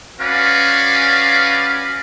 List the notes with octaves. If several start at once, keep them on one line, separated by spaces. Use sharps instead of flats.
C#4 F#4 B4 D5 F5